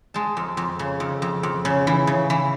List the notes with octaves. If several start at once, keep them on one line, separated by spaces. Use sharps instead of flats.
G#3 A5
F2
F2
C#3
F2
F2
F2
C#3
E3
C#3
E3